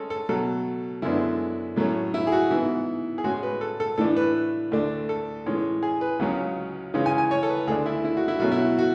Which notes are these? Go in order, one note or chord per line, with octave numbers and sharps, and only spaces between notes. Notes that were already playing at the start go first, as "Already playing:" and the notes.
Already playing: G#3 C#4 A4
A4
B2 F#3 A3 A4
F#2 D3 G#3 B3 D4 E4
A2 F#3 A3 C#4
E4
G#4
F#4
G#2 E3 B3 E4
G#4
A2 G#3 C#4 F#4
B4
A4
A4
A2 E3 A3 D4 A4
B4
D2 D3 A3 D4
A4
A2 E3 G#3 C#4
G#4
B4
C#2 C#3 F#3 C#4
C#3 E3 G#3 C#4
G#5
G#5
C#5
A4
B4
D2 D3 G#3 D4 G#4
E4
E4
F#4
E4
B2 F#3 A3 C#4 F#4
E4
F#4